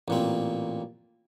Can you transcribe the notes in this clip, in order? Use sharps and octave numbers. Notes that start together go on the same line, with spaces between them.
A1 A#2 C4